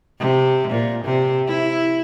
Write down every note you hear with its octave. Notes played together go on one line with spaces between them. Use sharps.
C3
A#2
C3
E4